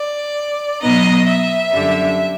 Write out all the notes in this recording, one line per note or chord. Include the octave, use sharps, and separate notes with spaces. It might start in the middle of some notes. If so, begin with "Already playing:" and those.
Already playing: D5
B2 F#3 B3 D#4 D#5
E5
F#2 D3 G3